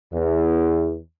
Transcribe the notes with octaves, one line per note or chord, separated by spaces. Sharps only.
E2